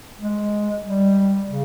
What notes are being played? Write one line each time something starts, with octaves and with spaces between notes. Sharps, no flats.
G#3
G3
C#3